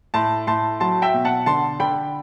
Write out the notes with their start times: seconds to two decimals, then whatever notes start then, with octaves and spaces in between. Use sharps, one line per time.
0.14 A2 A5 C6
0.47 A2 A5 C6
0.80 F#3 A5 C6
1.02 E5 G5
1.14 B2
1.25 F#5 A5
1.46 D3 A5 C6
1.80 D3 G5 B5